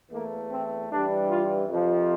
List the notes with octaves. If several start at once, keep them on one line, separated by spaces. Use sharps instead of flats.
E2 E3 A3 A#3
C4
G2 E3 G3 D4
F4
F2 C3 F3